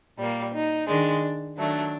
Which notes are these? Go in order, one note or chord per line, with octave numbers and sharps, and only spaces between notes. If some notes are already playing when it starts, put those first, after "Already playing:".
A#2 G3 A#3
D#4
D#3 G#3 D4
D#3 F#3 A3 D4